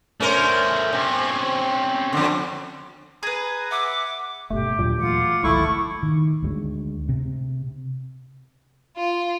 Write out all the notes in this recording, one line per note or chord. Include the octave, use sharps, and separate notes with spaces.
A3 C#4 A#4 C5
C3 C4 C#4
F2 D3
G#4 B4 A#5 D#6
E5 F#5 D6
F#1 G2 B2 A3 G4
D#2 A#2 F#3 D4
E3 F#3 A3 F4 F#5 D6
G1 C#2 D#3 F#3 A3 E4 C#6
D#3
D2 G3 G#3
C3
F4